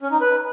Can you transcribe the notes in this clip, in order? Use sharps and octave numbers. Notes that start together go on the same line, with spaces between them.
C#4
D#4
B4